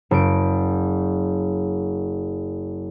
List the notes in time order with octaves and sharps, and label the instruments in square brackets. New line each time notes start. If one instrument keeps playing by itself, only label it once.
[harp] F#1 D7